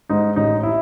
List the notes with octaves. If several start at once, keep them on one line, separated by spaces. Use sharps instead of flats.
G#2 D#4
A1 D#4
E4